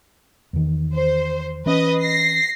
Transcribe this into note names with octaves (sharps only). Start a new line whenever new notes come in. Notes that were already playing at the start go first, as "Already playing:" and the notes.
E2 D#3
C5
E3 C#4 B4 D#5
A#6 C7